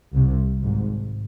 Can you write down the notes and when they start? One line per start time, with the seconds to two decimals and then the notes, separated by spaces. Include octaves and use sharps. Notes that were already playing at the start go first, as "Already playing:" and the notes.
0.14 C2 C3
0.63 G#1 G#2